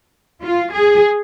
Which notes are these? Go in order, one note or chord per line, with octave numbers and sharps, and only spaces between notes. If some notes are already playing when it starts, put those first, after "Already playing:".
F4
G#4